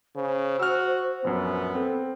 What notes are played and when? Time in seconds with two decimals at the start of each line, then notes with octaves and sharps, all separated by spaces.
0.16 C#3 C5
0.59 F#4 E6 F6
1.24 A#1 F#2 B3
1.75 C4 A4